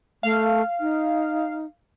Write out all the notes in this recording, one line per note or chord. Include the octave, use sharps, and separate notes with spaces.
A3 F5
D#4